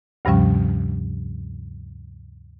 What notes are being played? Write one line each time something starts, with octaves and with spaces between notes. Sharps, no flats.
D2 G2 C3 F3 G3 C#4